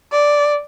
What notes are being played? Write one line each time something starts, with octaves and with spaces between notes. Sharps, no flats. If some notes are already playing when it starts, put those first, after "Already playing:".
D5